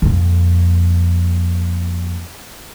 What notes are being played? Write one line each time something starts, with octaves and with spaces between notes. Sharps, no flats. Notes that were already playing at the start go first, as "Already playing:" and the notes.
F2 A#2